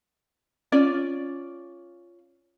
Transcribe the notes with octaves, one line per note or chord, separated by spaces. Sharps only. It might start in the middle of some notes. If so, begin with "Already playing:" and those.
C#4 F4 D5